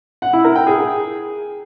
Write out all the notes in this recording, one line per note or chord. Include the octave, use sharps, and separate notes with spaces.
F#5
E4
A#4
G5
G#4